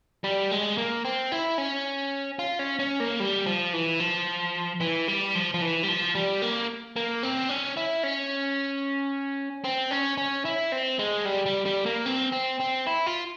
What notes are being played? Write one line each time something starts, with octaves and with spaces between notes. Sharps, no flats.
G3
G#3
A#3
C4
E4
C#4
F4
C#4
C#4
A#3
G3
F3
E3
F3
E3
G3
F3
F3
E3
G3
F3
G3
A#3
A#3
C4
C#4
E4
C#4
C4
C#4
C#4
E4
C4
G#3
G3
G3
G3
A#3
C4
C4
C4
E4
F4